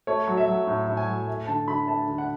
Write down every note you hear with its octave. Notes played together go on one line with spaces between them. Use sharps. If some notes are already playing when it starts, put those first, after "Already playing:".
A3 C#5
F#3
E5
F#3
A2
A2
G#5
F#3
A3
D3 A5
D3 B5
A3 A5
D3
F#5